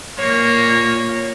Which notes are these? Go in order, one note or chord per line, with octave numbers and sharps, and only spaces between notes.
A#2 A#3 C#5